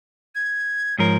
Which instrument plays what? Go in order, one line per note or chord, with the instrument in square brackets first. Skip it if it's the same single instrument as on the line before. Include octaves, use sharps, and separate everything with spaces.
[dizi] G#6
[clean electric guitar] G#2 F3 A#4 [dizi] C#5